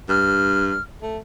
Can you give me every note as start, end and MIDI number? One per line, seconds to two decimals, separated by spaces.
0.09 0.77 43
0.09 0.80 89
1.02 1.18 57